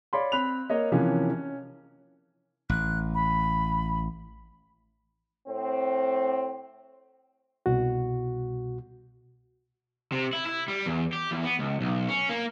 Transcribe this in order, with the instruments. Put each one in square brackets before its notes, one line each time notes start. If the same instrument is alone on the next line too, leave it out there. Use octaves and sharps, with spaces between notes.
[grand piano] C#5 D5 F5 B5 C6
C4 B5 F#6 F7
A#3 C#5 D#5
C3 E3 F3 A#3 C#4
C#4
[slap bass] A1 [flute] F#6
[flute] B5
[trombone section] A2 C4
[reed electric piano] C2 B2 F#4
[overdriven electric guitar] C3
E4
E4
G3
E2
G4
E2
B3
C#2
B1
C#4
A#3